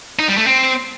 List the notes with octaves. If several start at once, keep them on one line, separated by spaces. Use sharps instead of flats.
D#4
G3
A3
C4